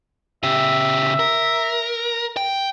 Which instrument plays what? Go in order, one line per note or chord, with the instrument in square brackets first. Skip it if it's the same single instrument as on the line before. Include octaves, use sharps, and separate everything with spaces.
[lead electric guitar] C#3 G4 [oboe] E5
[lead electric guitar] A#4
G5